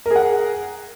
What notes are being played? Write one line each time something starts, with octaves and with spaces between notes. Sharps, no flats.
G#4 A#4 F#5